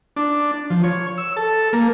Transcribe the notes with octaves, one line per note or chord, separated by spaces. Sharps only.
D4
F3
C#5
E6
A4
A#3